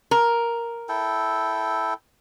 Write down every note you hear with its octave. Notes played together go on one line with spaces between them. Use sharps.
A#4
E4 A4 G5